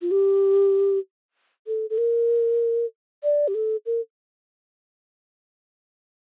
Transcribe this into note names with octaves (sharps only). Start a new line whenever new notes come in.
F4
G4
A4
A4
A#4
D5
G4
A4
A#4